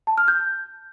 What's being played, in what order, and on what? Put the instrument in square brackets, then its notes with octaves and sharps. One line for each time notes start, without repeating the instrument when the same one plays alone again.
[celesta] A5
F6
G6